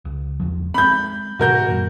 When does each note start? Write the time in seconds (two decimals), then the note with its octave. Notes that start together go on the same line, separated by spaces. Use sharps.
0.05 C#2
0.40 G1 E2 F3
0.74 G#3 A3 C4 B5 G6
1.39 G#2 B2 D#3 F#4 A#4 G6
1.68 F#2 A#2